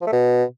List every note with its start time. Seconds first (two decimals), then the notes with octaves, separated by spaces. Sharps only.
0.02 F3
0.07 A3
0.12 B2